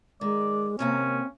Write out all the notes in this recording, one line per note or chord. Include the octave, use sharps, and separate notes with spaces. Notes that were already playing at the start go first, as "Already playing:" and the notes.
D#3 G#3 D5
D#2 C3 A#3 C4 C#4